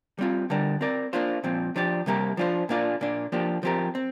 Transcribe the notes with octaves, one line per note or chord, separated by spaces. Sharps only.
G3 C4 F4
D3 G3 D4 A#4
C4 A#4 D5
A#3 D4 F4 C5
A#2 F3 C4
F3 D4 G4 D5
C3 G3 A#3 G4 A#4
F3 D4 F4 C5
A#2 A#3 D4 F4 D5
A#2 A#3 D4
F3 A#3 D4 G4
F3 C4 G4 A#4
C4